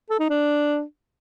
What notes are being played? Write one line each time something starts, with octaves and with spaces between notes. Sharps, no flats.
A4
D#4
D4